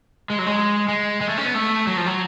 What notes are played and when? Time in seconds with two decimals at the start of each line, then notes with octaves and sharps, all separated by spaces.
0.30 G#3
0.39 F#3
0.46 G#3
0.88 G#3
1.21 G#3
1.29 A3
1.38 C#4
1.45 B3
1.54 A3
1.87 F#3
1.97 F3
2.06 F#3